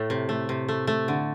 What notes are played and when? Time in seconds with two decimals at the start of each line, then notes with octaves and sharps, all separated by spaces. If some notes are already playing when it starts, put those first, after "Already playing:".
Already playing: A2 A3
0.10 C3
0.29 A3
0.49 C3
0.68 A3
0.87 A3
1.08 D3